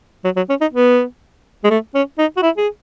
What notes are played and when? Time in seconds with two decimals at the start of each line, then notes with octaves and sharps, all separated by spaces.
0.25 F#3
0.37 F#3
0.49 C#4
0.61 D#4
0.73 B3
1.64 G#3
1.70 A3
1.95 C#4
2.18 D#4
2.37 F#4
2.42 E4
2.57 G#4